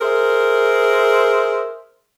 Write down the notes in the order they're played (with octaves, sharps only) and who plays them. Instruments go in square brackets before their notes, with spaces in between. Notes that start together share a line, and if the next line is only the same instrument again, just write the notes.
[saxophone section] G#4 A#4 C5 E5